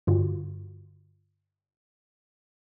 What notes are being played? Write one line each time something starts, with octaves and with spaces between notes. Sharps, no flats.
G2 D3 F4 F#4